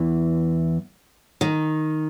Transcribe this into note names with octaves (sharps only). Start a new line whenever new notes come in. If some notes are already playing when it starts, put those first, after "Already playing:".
Already playing: E2 E3
D#3